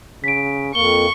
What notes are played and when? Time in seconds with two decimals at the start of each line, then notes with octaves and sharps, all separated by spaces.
0.24 C#3 B6 D7
0.75 F2 A#3 C#6 G7